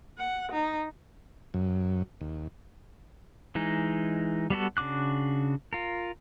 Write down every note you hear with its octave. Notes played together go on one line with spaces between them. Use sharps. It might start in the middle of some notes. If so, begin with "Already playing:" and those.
F#5
D#4
F#2
D#2
E3 G#3 D#4
G3 B3 F#4 A4
C#3 D4 F#4 D6 F#6
F4 A#4